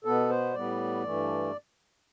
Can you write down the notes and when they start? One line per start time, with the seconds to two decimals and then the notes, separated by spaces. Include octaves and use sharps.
0.05 B2 B3 A4
0.29 C5
0.54 A2 G3 B3 D5
1.03 G2 E3 A3